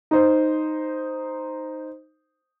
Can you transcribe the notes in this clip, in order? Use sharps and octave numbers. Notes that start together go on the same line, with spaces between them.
D#4 C5